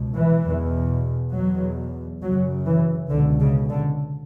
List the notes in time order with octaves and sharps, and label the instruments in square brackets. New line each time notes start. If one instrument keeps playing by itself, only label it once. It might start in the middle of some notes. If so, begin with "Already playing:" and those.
Already playing: [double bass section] C#2 B2
E3
E2 B2
E2 B2 F#3
F#2 F#3
C#3
E3
C#2 B2 D3
C#3
D3